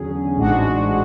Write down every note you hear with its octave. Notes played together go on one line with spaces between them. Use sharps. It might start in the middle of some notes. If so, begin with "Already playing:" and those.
Already playing: E2 D3 F#3 C#4 G#4
A1 G#2 G#3 D4 F#4